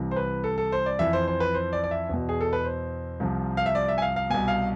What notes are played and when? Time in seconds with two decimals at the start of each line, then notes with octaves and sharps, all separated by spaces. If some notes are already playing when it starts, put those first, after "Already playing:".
Already playing: C2 C3 E3
0.11 C5
0.16 B4
0.44 A4
0.58 A4
0.72 C5
0.86 D5
0.99 F2 E3 E5
1.13 C5
1.28 C5
1.40 B4
1.54 C5
1.73 D5
1.84 D5
1.91 E5
2.09 E2 B2
2.29 G#4
2.41 A4
2.53 B4
2.65 C5
3.20 C2 C3 F3
3.57 F5
3.66 E5
3.75 D5
3.88 E5
3.98 G#5
4.02 F5
4.16 F5
4.30 C2 B2 G#5
4.48 F5